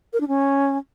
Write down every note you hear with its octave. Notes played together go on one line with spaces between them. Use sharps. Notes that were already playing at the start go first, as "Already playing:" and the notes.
A#4
D4
C#4